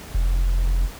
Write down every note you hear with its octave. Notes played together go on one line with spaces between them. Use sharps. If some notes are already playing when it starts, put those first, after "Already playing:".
F1